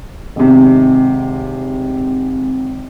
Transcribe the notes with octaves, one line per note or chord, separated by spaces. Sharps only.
G#1 C3